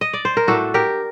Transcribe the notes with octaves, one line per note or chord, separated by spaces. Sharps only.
D#5
D5
C5
A#4
A2 A3 D4 F#4 A4
G4 A#4